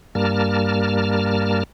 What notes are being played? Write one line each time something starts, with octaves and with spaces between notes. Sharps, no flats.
G2 G3 A#3 A#4 A5 F6